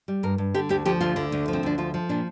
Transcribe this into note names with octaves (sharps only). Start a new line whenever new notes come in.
G3
G2 A#4
G2
D3 G4
D2 G4
F3 G4
D2 F4
D3
D2
F3
C4
D2 D4
F3 F4
F3
A#2 D4